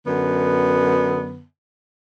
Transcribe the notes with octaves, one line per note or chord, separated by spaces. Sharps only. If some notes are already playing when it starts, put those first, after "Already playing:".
F#2 D3 B3